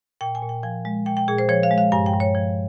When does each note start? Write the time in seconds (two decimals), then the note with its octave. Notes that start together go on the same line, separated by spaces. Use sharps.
0.21 A#2 G5
0.35 G#5
0.42 A#2
0.49 G5
0.63 F3 G#5
0.85 G#3
1.06 A#2 G5
1.17 G5
1.28 A#2 G#4
1.38 C5
1.49 F3 C#5
1.63 F5
1.71 G#3
1.78 F5
1.92 G2 G#5
2.06 G5
2.14 G2
2.20 C#5
2.35 F3